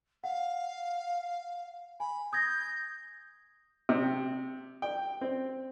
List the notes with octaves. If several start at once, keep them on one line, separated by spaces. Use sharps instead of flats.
F5 F#5
G#5 B5
D#6 G6 G#6 A#6
C3
G5
C4